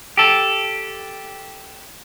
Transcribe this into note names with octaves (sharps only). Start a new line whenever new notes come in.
G4 A4